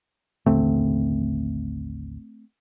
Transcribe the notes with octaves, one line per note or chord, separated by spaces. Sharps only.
A1 D#2 D3 A3 C4